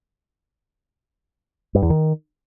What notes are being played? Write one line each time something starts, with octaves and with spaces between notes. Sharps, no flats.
G2
E2
D#3